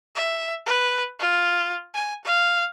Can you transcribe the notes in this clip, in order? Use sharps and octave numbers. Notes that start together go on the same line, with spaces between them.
E5
B4
F4
G#5
F5